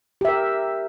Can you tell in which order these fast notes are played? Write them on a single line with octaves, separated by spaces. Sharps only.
G4 E5 A#4